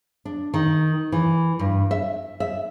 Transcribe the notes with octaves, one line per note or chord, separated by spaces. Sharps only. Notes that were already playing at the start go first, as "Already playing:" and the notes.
D4
D#3
E3
G2
E5
E5